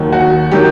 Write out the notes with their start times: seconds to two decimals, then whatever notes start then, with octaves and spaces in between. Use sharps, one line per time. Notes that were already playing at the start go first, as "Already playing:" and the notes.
Already playing: D#2 D#3 F#3
0.12 F#4
0.51 D#3 F#3 G4